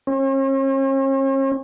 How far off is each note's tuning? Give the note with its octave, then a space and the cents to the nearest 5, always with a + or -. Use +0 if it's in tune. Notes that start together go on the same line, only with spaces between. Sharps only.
C#4 -45